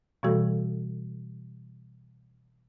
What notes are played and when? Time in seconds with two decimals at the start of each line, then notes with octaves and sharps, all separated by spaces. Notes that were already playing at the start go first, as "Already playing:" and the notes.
0.23 B2 E3 G3 A3 F#4 A4